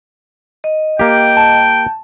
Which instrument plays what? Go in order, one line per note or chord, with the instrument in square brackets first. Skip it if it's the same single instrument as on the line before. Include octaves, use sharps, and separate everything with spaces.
[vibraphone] D#5
[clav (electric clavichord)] A#3 G4 [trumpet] G5
[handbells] A5